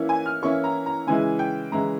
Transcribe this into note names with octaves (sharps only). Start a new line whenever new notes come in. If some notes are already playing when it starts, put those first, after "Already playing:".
Already playing: E3 A#3 C#4 E4
G#5
F6
E3 A#3 C#4 E4 C#6
A#5
A#5
C#3 E3 G#3 E4 G#5
G5
C#3 E3 G#3 E4 A#5